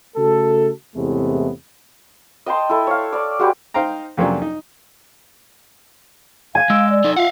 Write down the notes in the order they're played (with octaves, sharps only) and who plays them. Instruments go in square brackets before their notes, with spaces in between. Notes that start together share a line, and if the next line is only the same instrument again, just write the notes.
[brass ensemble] C#3 A3 F#4 A4
E2 A2 C3 G#3 A3 B3
[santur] D#5 G5 A5 C6
E4 A4
C#5 F5
D5 D6
G#3 F#4 G4 B4
[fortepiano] D#4 C5 F5 G5 A#5
F2 C3 F#3 A#3 C#4 D4
D#4
[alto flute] F5 [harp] G#5 G#6 D#7
[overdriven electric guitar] G#3 [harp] E6 D7
[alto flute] D5
[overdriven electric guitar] D#4 A4
[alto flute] F4 [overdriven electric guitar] F5 F#5